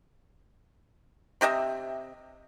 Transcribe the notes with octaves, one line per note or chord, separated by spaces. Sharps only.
C3 G4 D#5 E5